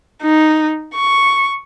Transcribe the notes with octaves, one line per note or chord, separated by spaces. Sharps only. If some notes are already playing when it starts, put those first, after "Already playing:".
D#4
C#6